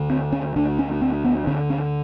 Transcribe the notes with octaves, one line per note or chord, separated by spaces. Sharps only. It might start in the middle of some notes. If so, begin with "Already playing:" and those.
Already playing: D2 D3
C4
C#4
D2 D3 D4
C#4
C4
B3
D2 D3 C#4
C#4